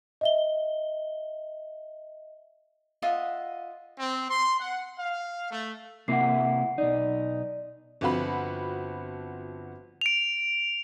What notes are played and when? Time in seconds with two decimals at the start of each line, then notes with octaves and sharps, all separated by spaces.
0.21 D#5 E5 G7
3.02 F4 D#5 E5 F#5
3.99 C4
4.29 C6
4.60 F#5
4.98 F5
5.51 A3
6.08 C3 A#3 E4 F#5 C7
6.78 B1 D#4 D5
8.01 G1 F3 C4 F#4 B5
10.01 D7 F7